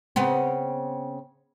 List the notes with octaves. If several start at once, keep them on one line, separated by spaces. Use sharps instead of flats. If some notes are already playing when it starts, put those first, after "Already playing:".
C#3 B3 C4